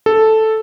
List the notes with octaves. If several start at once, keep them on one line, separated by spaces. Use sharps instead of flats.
A4